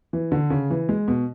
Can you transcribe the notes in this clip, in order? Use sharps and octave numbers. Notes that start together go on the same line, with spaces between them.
E3
D3
C#3
E3
G#3
B2